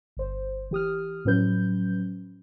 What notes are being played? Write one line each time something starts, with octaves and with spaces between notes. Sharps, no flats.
G1 C5
E3 G4 D#6 F6
A2 F3 F#3 C#4 B4 G6